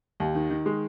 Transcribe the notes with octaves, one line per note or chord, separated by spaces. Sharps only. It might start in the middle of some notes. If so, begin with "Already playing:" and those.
D#2
D#3
D#3
G#3